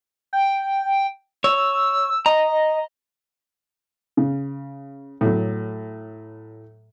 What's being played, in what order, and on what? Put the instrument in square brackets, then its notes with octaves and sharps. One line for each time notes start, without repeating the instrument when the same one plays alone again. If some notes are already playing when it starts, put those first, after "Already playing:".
[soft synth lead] G5
[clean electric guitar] C#5 [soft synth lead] E6
[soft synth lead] D#5 [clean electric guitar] A#5
[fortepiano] C#3
A2 F#3